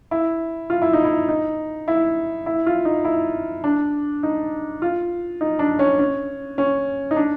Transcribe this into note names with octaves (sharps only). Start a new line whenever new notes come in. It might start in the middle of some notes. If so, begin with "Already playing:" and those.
E4
F4
E4
D#4
E4
D#4
E4
E4
F4
D#4
E4
D4
D#4
F4
D#4
D4
C#4
C#4
C#4
D#4
D4